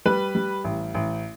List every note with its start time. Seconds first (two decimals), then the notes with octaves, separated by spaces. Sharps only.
0.06 G3 B4
0.35 G3
0.64 A1
0.95 A1